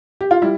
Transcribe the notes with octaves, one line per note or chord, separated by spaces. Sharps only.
G4
F4
G3 E4